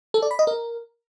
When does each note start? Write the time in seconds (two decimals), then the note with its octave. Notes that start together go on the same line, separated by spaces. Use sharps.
0.14 A4
0.22 D5
0.31 B5
0.39 D#5
0.47 A#4